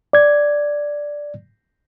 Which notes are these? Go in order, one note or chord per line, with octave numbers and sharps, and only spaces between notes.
D5 G#6